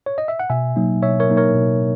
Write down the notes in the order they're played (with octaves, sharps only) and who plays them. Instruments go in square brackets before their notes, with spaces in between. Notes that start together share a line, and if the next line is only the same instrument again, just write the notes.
[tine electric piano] C#5
D#5
E5
F#5
B2 E5 G#5
F#3 A#3 D#4
B2 C#5 E5
A#4 C#5
F#3 A#3 D#4
A#4 C#5
B2